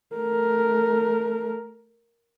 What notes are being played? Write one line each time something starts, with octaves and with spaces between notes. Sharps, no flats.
A3 A#4